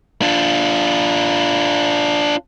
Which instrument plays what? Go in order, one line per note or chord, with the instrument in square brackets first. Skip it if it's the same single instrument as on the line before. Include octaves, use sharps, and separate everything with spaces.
[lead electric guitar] D4 F4